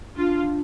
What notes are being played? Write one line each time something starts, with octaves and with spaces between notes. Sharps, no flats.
D4 F4